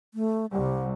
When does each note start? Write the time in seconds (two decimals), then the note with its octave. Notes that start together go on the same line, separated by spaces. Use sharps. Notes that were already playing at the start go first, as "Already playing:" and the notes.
0.14 A3
0.52 C2 G3